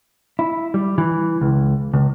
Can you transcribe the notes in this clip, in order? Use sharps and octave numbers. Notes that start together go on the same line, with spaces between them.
E4
G3
E3
C#2
C#2